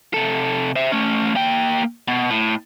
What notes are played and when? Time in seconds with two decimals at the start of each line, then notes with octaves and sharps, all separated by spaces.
0.14 C3 A4
0.76 C5 E5
0.92 A3 C#4
1.36 A#3 G5
2.08 B2
2.30 A2